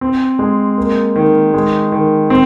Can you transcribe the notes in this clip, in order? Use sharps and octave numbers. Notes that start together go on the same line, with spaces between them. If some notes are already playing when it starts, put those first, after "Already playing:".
C4
G#3
A#3
D#3
G#3
D#3
C4